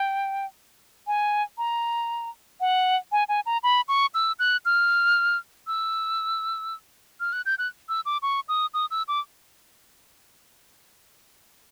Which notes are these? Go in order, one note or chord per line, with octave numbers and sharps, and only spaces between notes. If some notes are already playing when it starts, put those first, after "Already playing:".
Already playing: G5
G#5
A#5
F#5
G#5
G#5
A#5
B5
C#6
E6
F#6
F6
E6
F6
F#6
G6
F#6
E6
D6
C#6
D#6
D#6
E6
D6